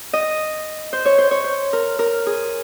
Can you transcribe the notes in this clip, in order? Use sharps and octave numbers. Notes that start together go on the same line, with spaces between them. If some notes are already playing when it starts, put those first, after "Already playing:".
D#5
C5
C#5
C5
C#5
C5
A#4
A#4
G#4